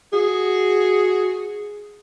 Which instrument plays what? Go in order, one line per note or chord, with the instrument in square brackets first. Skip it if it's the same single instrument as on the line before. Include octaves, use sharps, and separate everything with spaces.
[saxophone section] F#4 G#4